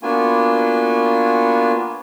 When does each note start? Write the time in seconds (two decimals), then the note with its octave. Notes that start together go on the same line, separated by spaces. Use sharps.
0.03 A#3 B3 D4 F4 F#4 G#5